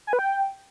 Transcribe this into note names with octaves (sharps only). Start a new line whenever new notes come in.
G#5
B4
G5